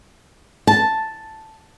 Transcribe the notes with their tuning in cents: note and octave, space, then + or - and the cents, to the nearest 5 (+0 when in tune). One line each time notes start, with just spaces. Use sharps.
A5 +0